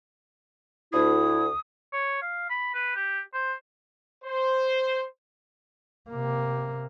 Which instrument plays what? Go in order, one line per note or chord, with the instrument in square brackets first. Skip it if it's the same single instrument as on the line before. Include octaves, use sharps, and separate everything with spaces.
[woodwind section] D2 E4 [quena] D#6
[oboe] C#5
F5
B5
B4
G4
C5
[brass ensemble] C5
[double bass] C3 A#3